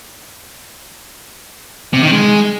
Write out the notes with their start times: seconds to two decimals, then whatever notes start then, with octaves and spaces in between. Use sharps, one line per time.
1.93 C3
2.03 D#3
2.12 G#3